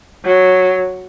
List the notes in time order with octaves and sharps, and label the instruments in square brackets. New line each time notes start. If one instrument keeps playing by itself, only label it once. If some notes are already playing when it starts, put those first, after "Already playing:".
[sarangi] F#3